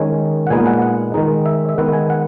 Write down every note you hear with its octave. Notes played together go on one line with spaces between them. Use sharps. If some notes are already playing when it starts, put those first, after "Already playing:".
Already playing: D#3 G#3 C#4 G#5
F#5
A#2 G#3 B3 D#4 G#5
F#5
F#5
D#3 G#3 D#4
E5
E5
D#3 G#3 B3 F#5
G#5
F#5